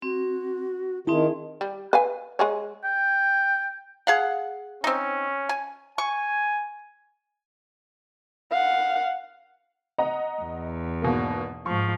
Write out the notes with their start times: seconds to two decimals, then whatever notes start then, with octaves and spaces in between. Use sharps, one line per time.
0.02 C4 F#4
1.07 D#3 C4 D#4 E4 G#4 A5
1.61 G3
1.93 B4 F5 G#5
2.39 G#3 G#4 C#5
2.84 G5
4.07 G#4 F5 F#5
4.84 C4 C#4 D#4
5.49 G#5
5.98 G#5 C#6
8.52 F5 F#5
9.98 D#5 F#5 A#5
10.42 E2
11.02 G#1 B2 A#3
11.66 G#2 F3 C#6